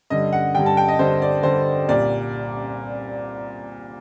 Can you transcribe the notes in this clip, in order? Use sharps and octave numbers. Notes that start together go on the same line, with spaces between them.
G2 D3 G3 D#5
F#5
G2 D3 G3 G5
A5
G5
D#5
G2 D3 G3 C5
D5
G2 D3 G3 C5
C2 A#2 G3 D5